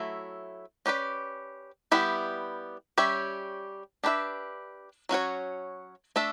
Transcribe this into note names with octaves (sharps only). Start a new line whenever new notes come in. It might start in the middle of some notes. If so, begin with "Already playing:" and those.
Already playing: F#3 A3 E4
C#4 G4 B4 D5
G3 B3 E4 G4
G3 C#4 G4 C#5 E5
D4 G4 B4 E5
F#3 C#4 F#4 C#5
A3 D4 A4 E5